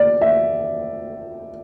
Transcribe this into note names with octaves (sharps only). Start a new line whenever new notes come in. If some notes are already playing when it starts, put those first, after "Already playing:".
Already playing: D5
E5